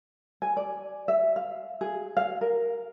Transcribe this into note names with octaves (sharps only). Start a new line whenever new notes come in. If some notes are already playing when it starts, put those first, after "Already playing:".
G#5
D5
E5
F5
G#4
F5
A#4